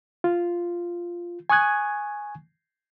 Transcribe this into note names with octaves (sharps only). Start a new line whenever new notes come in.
F4
G#5 C#6 D#6 F#6 G#6